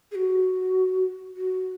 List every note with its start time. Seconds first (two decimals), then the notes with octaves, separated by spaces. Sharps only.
0.11 G#4
0.15 F#4
1.37 F#4